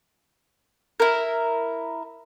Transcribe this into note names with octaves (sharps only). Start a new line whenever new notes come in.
E4 A#4